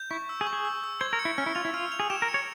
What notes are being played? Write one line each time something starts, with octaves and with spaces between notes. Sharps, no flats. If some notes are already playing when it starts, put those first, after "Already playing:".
Already playing: G6
E4 C#6
E6
G#4
C#6
G#4
E6
E6
C5 G#6
A#4
C#7
E4
C#4 F6
E4
F4 F7
E4
F4 F6
F7
G#4
G4 E7
A#4
C#7
C#5